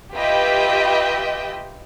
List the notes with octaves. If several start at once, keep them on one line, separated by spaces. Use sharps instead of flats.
F4 G4 B4 D#5 E5 G5